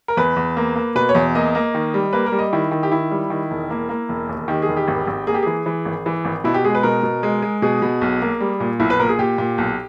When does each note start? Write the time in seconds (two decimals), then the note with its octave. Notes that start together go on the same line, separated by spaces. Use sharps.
0.08 A#4
0.17 E2 B4
0.36 E2
0.57 A#3
0.76 A#3
0.95 B2 B4
1.09 C#5
1.15 E2
1.35 A#3 D#5
1.55 A#3
1.74 D#3
1.94 G3
2.13 A#3 B4
2.26 A#4
2.32 G3
2.39 D#5
2.53 D#3 E4
2.71 D#3
2.83 G4
2.92 D#3 E4
3.11 G3
3.30 D#3
3.51 E1
3.70 A#3
3.89 A#3
4.09 E1
4.29 D#2
4.48 D#3 G4
4.62 G#4
4.69 E1
4.77 G4
4.88 G#1
5.07 G#1
5.27 A#3 G#4
5.34 G4
5.43 E3 G#4
5.66 E3
5.85 G#1
6.06 E3
6.25 G#1
6.44 B2 E4
6.54 G4
6.64 G#3 G#4
6.75 B4
6.83 B2 A#4
7.03 B2
7.23 G#3
7.42 G#3
7.62 B2 G#4
7.82 B2
8.01 B1
8.22 A#3
8.40 G3
8.60 A#2
8.80 B1 E4
8.90 B4
8.99 A#2 A#4
9.09 G#4
9.19 A#2 G4
9.38 A#2
9.58 B1